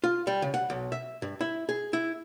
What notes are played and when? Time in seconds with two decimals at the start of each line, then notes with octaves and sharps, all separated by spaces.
0.04 F4
0.27 G3
0.42 C#3
0.54 F#5
0.70 B1
0.92 E5
1.22 G2
1.41 E4
1.69 G#4
1.93 E4